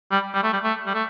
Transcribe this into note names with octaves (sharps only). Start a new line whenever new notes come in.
G3
G3
A3
G3
A3
G3
A3